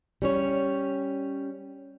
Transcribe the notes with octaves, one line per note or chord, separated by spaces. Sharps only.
G3 C#4 C#5